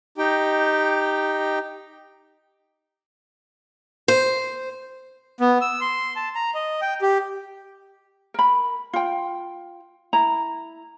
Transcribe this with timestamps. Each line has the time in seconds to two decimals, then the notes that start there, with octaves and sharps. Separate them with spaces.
0.18 D#4 G4 G5
4.08 C5
5.40 B3
5.61 E6
5.81 C6
6.16 A5
6.35 A#5
6.55 D#5
6.81 G5
7.01 G4
8.34 A#4 B5
8.93 F4 G5
10.13 E4 A#5